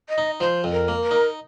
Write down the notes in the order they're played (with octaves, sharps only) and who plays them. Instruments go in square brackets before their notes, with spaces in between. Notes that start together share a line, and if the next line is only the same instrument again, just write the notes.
[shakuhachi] D#5
[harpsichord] D#4
[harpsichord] F3 [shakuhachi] C5
[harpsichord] F2
[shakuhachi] A#4
[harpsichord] A#3
[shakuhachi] A#4
[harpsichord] D#4